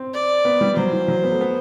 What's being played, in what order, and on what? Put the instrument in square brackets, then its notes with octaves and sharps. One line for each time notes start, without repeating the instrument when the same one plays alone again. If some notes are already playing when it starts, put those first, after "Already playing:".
Already playing: [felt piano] C4
[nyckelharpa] D5
[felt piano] B3
G3
[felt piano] F#3 [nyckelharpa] C5
[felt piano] E3
F#3
B3
A3
B3